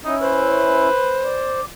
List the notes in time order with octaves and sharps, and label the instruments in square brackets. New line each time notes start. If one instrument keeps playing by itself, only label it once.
[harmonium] C#4 E4 [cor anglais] D#4
[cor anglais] B4 [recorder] C5
[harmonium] D5